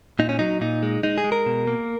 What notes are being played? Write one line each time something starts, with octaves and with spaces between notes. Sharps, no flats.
A#2 D#4
C#4
F#3 D#4
A#2 D#4
G#3
G#3 D#4
G#4
G#3
A#4
B2
A#3